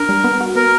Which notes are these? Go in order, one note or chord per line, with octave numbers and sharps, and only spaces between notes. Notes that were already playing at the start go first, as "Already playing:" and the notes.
Already playing: D4 A#4
G3
B3
F#4
B3 A#4